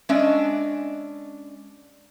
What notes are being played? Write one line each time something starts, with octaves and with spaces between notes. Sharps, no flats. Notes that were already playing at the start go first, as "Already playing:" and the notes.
G#3 C#4 D4 D#5 E5